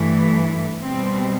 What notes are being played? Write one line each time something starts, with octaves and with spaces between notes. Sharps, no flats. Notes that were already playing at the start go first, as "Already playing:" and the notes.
Already playing: G2 E3 A3
B2 G3 C4